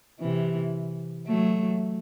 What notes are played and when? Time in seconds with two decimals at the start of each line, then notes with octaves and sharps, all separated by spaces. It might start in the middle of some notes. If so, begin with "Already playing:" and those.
0.20 C3 E3
1.27 F#3 A3